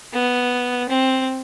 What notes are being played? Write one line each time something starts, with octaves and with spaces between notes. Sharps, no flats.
B3
C4